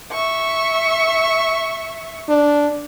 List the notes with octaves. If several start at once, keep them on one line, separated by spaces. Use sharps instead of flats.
E5 C#6
D4